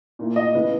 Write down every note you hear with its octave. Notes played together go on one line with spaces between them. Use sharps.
A#2 A#3 E4
D#5
C#3 E3 B3 E4 B4